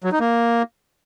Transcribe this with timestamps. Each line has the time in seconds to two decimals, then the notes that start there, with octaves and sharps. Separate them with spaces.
0.04 F#3
0.12 D#4
0.20 A#3